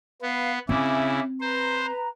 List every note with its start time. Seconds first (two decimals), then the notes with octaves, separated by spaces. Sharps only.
0.22 B3 B4 F5
0.69 C#3 C4 E4 E5 G#5 D6
1.41 B4 C5 A#5